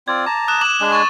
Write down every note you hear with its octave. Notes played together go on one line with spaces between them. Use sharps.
C4 F4 D5 G#6
A5 A#5 D6
D#6 F#6 E7
D6 E7 F#7
G#3 D4 G#5
C#6 A6